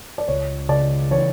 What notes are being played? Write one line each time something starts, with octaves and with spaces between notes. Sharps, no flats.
D5
C#2 C#5
C#3 D5
E3 C#5